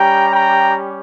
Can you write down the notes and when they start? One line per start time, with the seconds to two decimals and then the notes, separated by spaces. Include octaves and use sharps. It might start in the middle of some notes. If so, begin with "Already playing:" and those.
Already playing: G3 C#4 G4 G5 A#5
0.32 G5 A#5